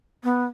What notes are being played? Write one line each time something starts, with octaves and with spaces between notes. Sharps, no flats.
B3